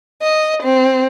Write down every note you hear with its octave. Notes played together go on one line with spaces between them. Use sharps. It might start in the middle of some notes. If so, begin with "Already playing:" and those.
D#5
C4